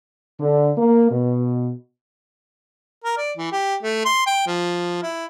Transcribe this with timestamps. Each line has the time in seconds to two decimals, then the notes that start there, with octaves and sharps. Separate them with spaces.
0.39 D3
0.77 A#3
1.10 B2
3.04 A#4
3.17 D5
3.37 E3
3.52 G4
3.83 A3
4.05 C6
4.26 G5
4.47 F3
5.03 E4